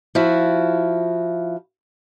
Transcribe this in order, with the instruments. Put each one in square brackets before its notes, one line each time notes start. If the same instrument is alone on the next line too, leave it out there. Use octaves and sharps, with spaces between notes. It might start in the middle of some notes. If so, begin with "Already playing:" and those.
[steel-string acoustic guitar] F3 E4 F#4